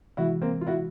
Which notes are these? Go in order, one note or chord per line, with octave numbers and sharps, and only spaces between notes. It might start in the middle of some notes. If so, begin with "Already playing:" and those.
C3 E3 G#3 E4 F#4
A#3 C4
F4
E4 F#4